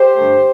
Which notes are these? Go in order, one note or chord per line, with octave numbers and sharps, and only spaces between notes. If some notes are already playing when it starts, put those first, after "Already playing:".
Already playing: G4 C5
G2 D3 A3